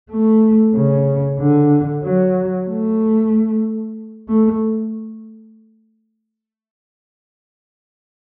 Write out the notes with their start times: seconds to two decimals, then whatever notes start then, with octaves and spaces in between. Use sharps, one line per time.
0.11 A3
0.75 C#3
1.40 D3
2.04 F#3
2.68 A3
4.29 A3